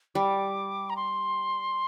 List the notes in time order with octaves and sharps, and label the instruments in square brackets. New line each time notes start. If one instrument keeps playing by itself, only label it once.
[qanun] G3 [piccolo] D6
[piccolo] A#5
C6